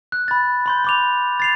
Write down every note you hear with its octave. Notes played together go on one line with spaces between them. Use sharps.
F#6
B5 A6
B5 C6 G6
B5 D6 F7
A6 C7 F7